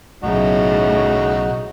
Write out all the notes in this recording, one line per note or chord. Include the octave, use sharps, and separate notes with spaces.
B1 A2 C#3 D#4 F#4